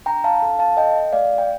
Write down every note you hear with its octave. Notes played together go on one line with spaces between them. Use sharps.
D4 G5 A#5
F5 A5
A4
F5 A5
A4 D#5 G5
A3 D5 F5
G5